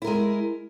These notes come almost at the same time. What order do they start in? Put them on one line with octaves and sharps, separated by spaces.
E4 A#4 G#3